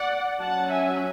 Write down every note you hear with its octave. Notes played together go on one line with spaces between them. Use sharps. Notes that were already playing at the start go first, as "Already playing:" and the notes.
Already playing: D5 F#5
F#3 C#4 F#5 A5
E5 G#5